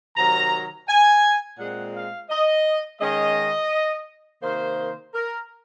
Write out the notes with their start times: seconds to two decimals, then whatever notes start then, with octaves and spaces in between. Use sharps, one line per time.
0.16 C3 D#3 F#3 A#5
0.88 G#5
1.59 A#2 G#3 C4 F#5
1.95 F5
2.30 D#5
3.01 D#3 G#3 C#4 D#5
4.42 C3 D#3 A#3 C5
5.14 A#4